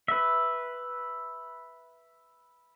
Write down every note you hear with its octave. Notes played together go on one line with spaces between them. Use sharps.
B4 E5